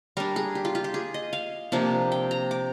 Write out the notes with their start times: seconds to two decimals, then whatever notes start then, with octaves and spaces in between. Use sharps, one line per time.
0.17 G3 D4 A#4
0.36 G#4
0.55 G4
0.65 F4
0.75 F4
0.84 G4
0.94 G#4
1.14 D#5
1.33 F5
1.72 C3 F3 A#3 D4
2.12 G5
2.31 A#5
2.51 D6